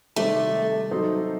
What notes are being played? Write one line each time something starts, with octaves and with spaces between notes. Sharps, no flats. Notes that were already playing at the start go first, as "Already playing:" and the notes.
C3 D#3 G3 A3 C4 G4
F#3 C4 D#4 A4 C5